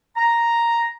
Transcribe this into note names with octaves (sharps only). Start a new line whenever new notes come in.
A#5